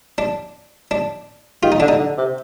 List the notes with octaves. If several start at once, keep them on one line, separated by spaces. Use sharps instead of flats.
D4
D4
D#3 F4
D#4
D3 D4
D#4
D3
C3